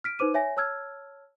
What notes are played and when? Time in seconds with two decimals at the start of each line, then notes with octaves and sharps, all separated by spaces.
0.04 F6 B6 D7
0.19 D#4 B4 C5 D6 D#7
0.34 C#5 E5 G#5 A#6
0.57 C#5 A5 E6 F6 G#6